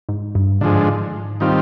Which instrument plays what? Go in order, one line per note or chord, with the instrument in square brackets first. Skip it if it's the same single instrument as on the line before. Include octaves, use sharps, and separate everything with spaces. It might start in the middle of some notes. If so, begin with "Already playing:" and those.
[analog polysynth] G#2
G2
[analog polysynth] G#2 [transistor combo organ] D3 F3 G#3
[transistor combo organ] D#3 G3 C4 F4